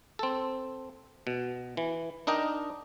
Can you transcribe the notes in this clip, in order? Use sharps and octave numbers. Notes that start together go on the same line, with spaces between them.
C4 A4
B2
E3
D4 D#4 A#4 D#5 G5